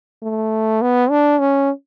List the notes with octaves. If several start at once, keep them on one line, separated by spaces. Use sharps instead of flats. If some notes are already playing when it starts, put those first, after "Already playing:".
A3
B3
D4
C#4